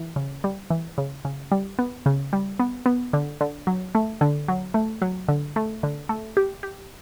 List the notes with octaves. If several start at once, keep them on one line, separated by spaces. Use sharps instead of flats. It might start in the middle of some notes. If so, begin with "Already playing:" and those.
Already playing: E3
C#3
G3
E3
C#3
C#3
G3
B3
C#3
G3
B3
B3
D3
D3
F#3
A3
D3
F#3
A3
F#3
D3
A3
D3
A3
G4
G4